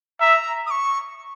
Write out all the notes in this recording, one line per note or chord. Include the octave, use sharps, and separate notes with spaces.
E5 A#5
D#6
C#6